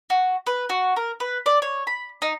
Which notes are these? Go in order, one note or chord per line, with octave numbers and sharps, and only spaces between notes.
F#4
B4
F#4
A#4
B4
D5
C#5
B5
D#4